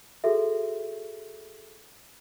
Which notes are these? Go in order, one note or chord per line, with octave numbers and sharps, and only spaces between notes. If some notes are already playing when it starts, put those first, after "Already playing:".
F#4 G#4 A4 E5